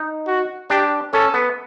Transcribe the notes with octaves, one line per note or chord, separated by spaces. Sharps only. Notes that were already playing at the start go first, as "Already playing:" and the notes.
Already playing: D#4
F#4
D4 G4
C#4 A4
B3